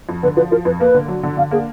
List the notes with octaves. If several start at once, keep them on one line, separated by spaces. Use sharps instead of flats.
F2
D3 B4
F3 B4
F3 A#4
F2 B4
A#3 B4
D3
F#3
D3
D3 F5
A#3 G#4